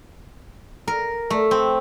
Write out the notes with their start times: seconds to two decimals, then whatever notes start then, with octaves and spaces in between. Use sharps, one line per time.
0.88 A#4
1.30 A3
1.51 C4